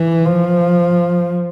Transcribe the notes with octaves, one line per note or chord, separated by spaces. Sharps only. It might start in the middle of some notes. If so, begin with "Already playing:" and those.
Already playing: E3
F3